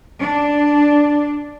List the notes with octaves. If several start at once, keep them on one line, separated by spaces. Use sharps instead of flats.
D4